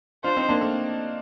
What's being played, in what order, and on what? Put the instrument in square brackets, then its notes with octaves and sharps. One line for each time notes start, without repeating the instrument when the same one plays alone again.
[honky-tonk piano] D4 F4 [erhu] C5
[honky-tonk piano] C4 D#4
A#3 D4
A3 C4